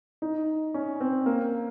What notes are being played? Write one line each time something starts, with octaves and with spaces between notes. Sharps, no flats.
D#4
C#4
C4
A#3